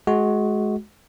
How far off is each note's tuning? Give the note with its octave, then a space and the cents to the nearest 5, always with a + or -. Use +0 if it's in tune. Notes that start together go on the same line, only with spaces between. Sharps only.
G#3 +25 F#4 +0